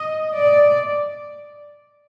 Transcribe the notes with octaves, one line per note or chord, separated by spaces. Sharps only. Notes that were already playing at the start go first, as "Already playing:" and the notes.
Already playing: D#5
D5